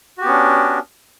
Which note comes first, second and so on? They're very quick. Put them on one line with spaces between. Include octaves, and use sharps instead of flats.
F#4 G4 B3 C#4 D4